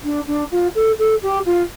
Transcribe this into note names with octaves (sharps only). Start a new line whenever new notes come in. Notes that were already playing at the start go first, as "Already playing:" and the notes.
D4
D4
F4
A4
A4
G4
F4